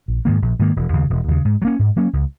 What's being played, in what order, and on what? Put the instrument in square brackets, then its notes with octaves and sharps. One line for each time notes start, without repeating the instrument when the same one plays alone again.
[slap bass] A#1
G#2 D#3 A#3
A#1
G#2 D#3 A#3
E1
D#2 C#3
E1
D#2 C#3
G#2
F#3
A#3 C#4
G#2
F#3 A#3 C#4
C#2